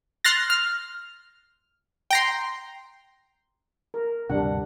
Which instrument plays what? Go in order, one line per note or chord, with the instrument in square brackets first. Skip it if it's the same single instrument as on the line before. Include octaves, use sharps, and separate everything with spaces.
[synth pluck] C6 F6 F#6 A6 A#6
F6
G5 A#5 C6
[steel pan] A#4
[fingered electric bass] D2 G2 C3 [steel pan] G3 D4 F#5